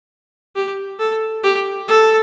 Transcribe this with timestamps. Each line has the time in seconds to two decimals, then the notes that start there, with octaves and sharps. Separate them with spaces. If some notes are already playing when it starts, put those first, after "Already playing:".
0.56 G4
0.99 A4
1.44 G4
1.88 A4